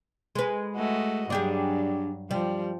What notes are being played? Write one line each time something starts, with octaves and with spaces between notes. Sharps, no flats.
G#3 B4
A3 F#4 D#5
G2 F#3 D4 G4 G#4
F3 G3